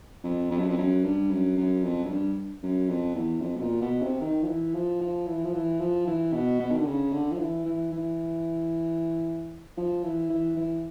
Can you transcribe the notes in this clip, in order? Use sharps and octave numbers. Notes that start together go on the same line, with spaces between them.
F2
F2
F#2
F2
F#2
G2
F#2
F#2
F2
F#2
G2
F#2
F2
E2
F2
B2
A#2
B2
C3
D#3
F3
E3
F3
F3
E3
F3
E3
F3
E3
B2
B2
D#3
D3
C#3
D3
F3
E3
E3
E3
F3
E3
E3
E3